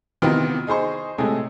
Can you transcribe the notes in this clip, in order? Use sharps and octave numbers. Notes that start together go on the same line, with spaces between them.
C3 D#3 E3 B3 F4 F#4
D#4 G#4 C5 C#6
A2 C3 G#3 A3 G#4